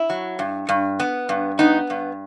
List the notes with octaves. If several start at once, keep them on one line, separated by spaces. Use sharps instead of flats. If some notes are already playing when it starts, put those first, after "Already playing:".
Already playing: E4
F#3
G2
G2
B3
G2
B3 D#4
G2